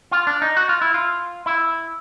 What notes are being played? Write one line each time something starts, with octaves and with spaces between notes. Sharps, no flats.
F4
D4
D#4
F#4
F4
E4
F4
E4